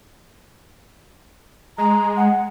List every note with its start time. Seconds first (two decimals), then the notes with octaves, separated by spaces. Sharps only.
1.78 G#3 A#5
2.17 F#5